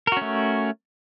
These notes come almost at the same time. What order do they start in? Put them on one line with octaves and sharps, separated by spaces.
A#4 F#4 C#4 A3